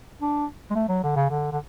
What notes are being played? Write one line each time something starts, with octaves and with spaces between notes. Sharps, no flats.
D4
G#3
A3
F#3
D3
C#3
D3
D3